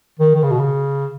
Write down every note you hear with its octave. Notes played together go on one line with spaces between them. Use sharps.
D#3
D#3
C#3
B2
C#3